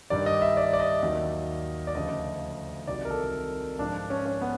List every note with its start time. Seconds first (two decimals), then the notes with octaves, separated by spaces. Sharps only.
0.10 G2 D#3 G3 D5
0.26 D#5
0.42 E5
0.57 D5
0.73 D5
0.80 D#5
1.03 D#2 D#3 F#3
1.87 D5
1.95 D2 C#3 F3 D#5
2.87 C2 C3 D#3 F#3 D5
3.05 A#4
3.10 A4
3.79 G#2 F3 D4
4.10 C#4
4.26 C#4
4.41 B3